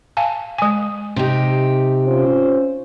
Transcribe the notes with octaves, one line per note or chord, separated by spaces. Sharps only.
F5 G#5 A5
G#3 G#5
C3 D#4 G4
C#4 F4 C5